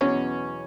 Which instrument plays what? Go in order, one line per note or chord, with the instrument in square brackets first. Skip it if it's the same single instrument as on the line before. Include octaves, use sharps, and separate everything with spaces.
[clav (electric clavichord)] E2 B2 F#3 [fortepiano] C#4